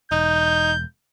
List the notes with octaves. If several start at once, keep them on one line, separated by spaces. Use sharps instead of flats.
E1 D#4 G6